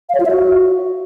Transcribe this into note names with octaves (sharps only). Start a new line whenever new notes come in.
F5
C#5
F4
E5
F#4